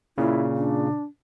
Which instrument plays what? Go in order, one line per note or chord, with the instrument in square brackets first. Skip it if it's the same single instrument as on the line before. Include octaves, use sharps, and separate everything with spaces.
[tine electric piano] A#2 C#3 [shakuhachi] E4
[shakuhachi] D4